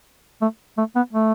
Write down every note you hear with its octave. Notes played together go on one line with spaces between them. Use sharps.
A3
A3
B3
A3